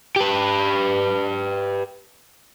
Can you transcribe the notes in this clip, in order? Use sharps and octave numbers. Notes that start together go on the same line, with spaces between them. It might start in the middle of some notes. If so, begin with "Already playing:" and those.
G4 B4